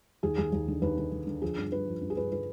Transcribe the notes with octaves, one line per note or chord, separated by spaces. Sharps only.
D#2 G#4
D#2 G#4
D#2
D3
D#2 B4
D3
D3
D3
F3 G#4
G2
G2 B4
F3
G2
G#4
G2 B4
D3 B4